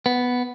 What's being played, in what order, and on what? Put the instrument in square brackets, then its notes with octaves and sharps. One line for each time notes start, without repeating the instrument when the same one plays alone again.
[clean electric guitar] B3